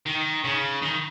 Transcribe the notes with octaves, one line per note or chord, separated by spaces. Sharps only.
D#3
C#3
D#3